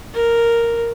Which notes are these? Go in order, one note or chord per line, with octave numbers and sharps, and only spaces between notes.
A#4